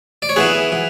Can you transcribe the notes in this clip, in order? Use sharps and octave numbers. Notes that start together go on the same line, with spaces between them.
D5
C#5
E3 B3 E4 G#4 B4
E3